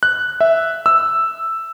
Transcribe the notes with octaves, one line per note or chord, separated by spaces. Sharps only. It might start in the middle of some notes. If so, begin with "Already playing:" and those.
F#6
E5
E6